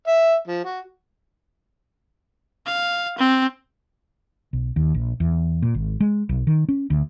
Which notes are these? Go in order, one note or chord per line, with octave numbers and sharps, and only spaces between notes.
E5
F3
F#4
F5
C4
B1
D#2
A#1
E2
A#2
G#1
G#3
B1
D#3
C#4
D2